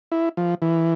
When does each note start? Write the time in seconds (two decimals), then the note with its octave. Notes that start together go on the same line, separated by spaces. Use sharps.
0.12 E4
0.37 F3
0.62 E3